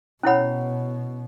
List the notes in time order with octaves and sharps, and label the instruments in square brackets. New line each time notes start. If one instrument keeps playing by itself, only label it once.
[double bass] B2 [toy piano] C#4 E4 C#5 F#5 B5